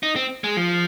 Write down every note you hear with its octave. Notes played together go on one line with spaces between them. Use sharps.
D#4
C4
G#3
F3